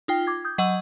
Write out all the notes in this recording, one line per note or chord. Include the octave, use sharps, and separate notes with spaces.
D#4 F4 G5
D6 G#6
D#6 G6
F#3 D#5 F#5 E6